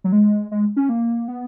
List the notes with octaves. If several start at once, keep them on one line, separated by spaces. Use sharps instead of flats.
F#3
G#3
G#3
C#4
A#3
B3